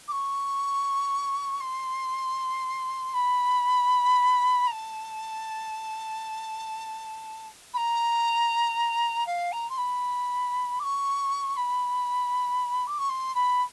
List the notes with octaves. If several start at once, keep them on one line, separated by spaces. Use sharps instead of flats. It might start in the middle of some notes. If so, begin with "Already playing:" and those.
D6
C#6
C6
B5
A#5
A5
B5
A#5
F5
A#5
C6
B5
D6
C#6
B5
D6
C#6
C6
B5